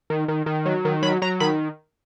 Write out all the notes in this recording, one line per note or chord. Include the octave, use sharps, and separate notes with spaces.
D#3
D#3
D#3
F#3
D#3
F#3 B5
F#3 A#5
D#3 B5